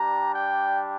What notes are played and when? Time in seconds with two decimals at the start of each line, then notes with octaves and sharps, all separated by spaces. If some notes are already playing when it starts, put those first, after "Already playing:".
Already playing: G3 D4 G4 A#5
0.35 G5